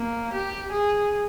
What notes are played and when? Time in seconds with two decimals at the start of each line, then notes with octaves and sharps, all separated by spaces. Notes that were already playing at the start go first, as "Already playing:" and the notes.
Already playing: A#3
0.33 G4
0.71 G#4